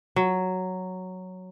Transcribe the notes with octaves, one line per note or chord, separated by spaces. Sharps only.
F#3